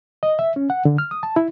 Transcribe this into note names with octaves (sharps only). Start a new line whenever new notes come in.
D#5
E5
C#4
F#5
D3
F6
D#6
A5
E4